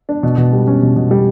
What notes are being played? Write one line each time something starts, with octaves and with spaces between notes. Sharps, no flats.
D4
B2
B2
G3
C#4
B2
B2
G3